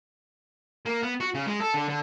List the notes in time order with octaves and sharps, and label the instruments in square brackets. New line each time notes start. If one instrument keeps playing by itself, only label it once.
[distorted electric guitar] A#3
B3
F#4
C#3
G#3
A4
D3
D3